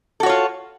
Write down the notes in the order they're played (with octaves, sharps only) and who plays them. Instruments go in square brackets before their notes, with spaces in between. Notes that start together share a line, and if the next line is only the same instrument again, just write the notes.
[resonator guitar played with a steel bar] A4
F#4
C#5
F4